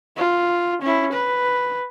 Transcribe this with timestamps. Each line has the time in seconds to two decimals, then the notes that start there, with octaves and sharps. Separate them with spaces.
0.17 F4
0.82 C#4 E4
1.13 B4